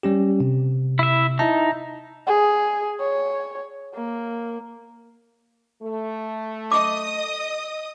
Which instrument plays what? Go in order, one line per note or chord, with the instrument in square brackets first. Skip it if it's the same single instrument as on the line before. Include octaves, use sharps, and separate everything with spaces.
[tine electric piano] G3 C#4 G4
C3
[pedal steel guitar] E4 E5
[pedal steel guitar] D#4 [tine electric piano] E4 E5 A5
[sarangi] G#4
C#5
A#3
[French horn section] A3
[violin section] D#5 D#6 [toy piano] D6